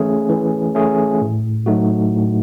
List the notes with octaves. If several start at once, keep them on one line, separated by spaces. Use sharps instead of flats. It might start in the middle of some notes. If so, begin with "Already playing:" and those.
Already playing: E3 A3 C#4 G#4
E3
A3 C#4 G#4
A2
F#3 A3 D#4 F#4
A2